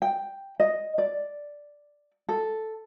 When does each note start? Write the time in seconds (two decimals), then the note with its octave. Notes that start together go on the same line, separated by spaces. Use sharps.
0.02 G5
0.60 D#5
0.98 D5
2.29 A4